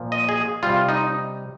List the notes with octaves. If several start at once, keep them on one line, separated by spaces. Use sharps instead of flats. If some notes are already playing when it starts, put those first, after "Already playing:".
Already playing: A#2 F3
D#5
G#4
C3 G3 F4
D#4